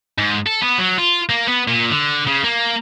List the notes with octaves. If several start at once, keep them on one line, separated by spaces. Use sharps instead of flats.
G#2
A4
B3
F#3
F4
A#3
B3
A#2
D3
C#3
A#3